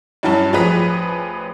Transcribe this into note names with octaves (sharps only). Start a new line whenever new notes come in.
G2 E3 F#3 G3 C#4 A5
A1 F3 G#4 B4 A#5 B6